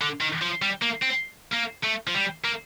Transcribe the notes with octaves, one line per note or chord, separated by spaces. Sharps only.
D3
D#3
F3
G3
A#3
C4
A#3
A3
F3
G3
A#3